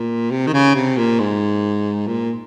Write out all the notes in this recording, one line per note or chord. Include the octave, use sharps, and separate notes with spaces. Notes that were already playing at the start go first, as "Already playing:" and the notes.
Already playing: A#2
C3
D#3
C#3
C3
A#2
G#2
A#2